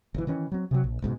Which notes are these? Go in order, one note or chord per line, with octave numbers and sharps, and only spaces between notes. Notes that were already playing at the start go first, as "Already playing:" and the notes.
G1 E3
D#3 E3 C#4
F#3 C4
C3 F#3
A#1
F#1 G#2 B2